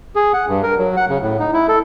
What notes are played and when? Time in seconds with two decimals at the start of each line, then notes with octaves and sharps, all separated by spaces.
0.16 G#4
0.33 F#5
0.48 G2
0.63 A#4
0.79 F#3
0.97 F#5
1.09 C#3
1.22 A2
1.40 D#4
1.53 E4
1.69 A4